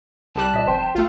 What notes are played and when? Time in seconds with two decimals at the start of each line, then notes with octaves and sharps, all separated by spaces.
0.35 C2 G3 A5 F#6
0.54 A#2 D5 D#5 B6
0.66 F1 F2 C5 G5
0.95 A#1 A3 F4